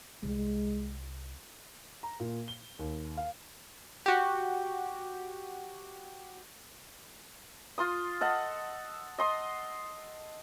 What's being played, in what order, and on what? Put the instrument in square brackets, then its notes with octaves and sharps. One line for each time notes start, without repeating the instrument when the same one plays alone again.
[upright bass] C2 [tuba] G#3
[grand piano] A#5
A#2
G7
D#2
F5
[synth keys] F#4 G4
[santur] F4 C6 D#6
A4 D#5 F#5
D#5 C6 D#6